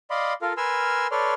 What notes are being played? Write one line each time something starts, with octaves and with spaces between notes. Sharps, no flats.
D5 D#5 F5 B5 C6
F4 A4 A#4 F5
A#4 B4 G#5 C6 E6 F6
A4 B4 C#5 D5 C6 F6